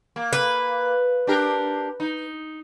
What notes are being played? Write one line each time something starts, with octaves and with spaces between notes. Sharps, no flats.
A#3
B4
D4 G4 A#4
D#4